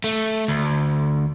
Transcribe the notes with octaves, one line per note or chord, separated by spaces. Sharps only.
A3
D2